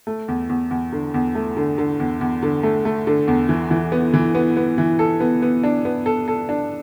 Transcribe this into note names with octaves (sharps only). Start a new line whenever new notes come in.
A3
E2
E2
E2
D3
E2
A3
D3
D3
E2
E2
D3
A3
A3
D3
E2
E3
E3
B3
E3
B3
B3
E3
A4
B3
B3
D4
B3
A4
A4
D4